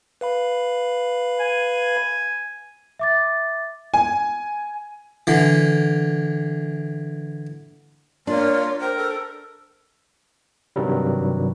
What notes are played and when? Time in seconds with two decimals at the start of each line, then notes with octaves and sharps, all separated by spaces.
0.21 B4 F5 B5
1.40 G#5
2.99 E5 D6 A6
3.94 G#5
5.27 D3 E3
8.27 A#3 D4 F4 C#5
8.80 A#4 C5 G5
8.96 A4 C5
10.76 G2 C3 D#3 F#3 G3